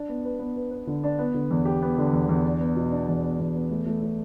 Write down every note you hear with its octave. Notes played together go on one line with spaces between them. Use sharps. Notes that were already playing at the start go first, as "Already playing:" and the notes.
Already playing: D4
B3
B4
B3
B4
B4
D3
D4
B3
D3
E2
G4
B3
D3
E2
E2
D4
B3
B2
D4
E2
B3
E2
B3
A3
A3
A3